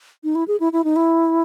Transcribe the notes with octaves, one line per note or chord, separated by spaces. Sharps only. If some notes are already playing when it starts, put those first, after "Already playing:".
D#4
E4
G#4
E4
E4
D#4
E4